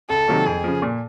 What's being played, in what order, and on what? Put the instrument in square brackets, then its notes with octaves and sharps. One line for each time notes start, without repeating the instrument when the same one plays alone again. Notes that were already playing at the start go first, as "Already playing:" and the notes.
[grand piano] C#2 [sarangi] A4
[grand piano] C3 D#3 F#3 A#3
[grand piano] F2 [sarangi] G#4
[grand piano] C#3 F3
A#2